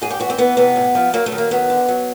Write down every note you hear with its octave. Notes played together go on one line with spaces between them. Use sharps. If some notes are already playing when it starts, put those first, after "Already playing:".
G#2 G#4
G4
E3 F#4
C4
E3 B3
C3 B3
A2
F3
F#3 A#3
A3
D#3
A#3
F#3 B3
D3
F#3